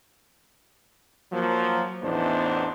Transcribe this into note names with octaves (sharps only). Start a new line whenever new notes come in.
F3 F#3 A#3
A1 E2 B3 D4 D#4 C5